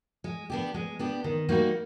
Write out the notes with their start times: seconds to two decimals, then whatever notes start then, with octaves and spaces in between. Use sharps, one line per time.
0.24 G#3
0.50 B3 D4 G4
0.74 G#3
0.99 B3 D4 G4
1.24 D#3
1.49 G3 A#3 D#4 F#4